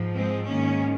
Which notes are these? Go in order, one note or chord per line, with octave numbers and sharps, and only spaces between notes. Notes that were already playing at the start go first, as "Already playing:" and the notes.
Already playing: G#2 F3
G#3 C4
G#2 D#3 A#3 C#4